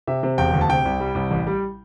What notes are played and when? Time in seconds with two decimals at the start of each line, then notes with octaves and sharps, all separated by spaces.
0.07 C3 E5
0.23 C3
0.38 E1 G5
0.54 D2
0.61 A5
0.69 C3 G5
0.85 C2
1.00 G3
1.15 C2
1.31 A1
1.47 G3